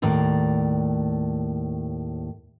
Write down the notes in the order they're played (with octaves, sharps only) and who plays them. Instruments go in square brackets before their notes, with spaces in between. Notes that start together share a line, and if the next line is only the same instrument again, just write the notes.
[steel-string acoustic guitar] D#2 A2 D5 A#5